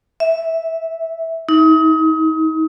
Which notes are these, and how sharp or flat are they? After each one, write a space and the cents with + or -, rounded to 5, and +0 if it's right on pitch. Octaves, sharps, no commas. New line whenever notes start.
E5 -5
D#4 +35